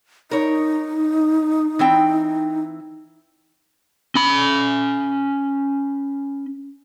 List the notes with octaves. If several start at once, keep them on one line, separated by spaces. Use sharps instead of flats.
D#4 A#4 C#5
E3 C4 G5
C#4 B5